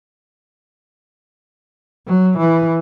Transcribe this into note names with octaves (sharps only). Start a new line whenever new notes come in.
F#3
E3